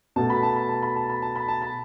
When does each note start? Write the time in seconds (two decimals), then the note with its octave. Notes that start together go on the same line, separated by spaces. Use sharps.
0.16 B2 A3 A5
0.30 B5
0.43 A5
0.56 B5
0.69 A5
0.83 B5
0.96 A5
1.09 B5
1.22 A5
1.35 B5
1.48 A5
1.62 B5